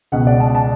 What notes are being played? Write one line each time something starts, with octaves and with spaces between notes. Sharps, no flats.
C#2 B2 F#5
D5
A5
A5